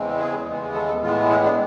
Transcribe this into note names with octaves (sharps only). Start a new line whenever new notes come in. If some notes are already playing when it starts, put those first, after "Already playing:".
Already playing: E2 C#3 E3 G#3 C4
G#4
D#2 C#3 E3 G#3 B3
A4
A4
A2 E3 G#3 B3 F4
E4
D4